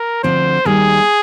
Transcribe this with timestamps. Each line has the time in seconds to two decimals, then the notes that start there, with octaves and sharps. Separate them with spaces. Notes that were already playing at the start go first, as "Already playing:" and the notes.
Already playing: A#4
0.23 D2 D3 F3 C4 C5
0.65 D#2 D#3 G3 A#3 G#4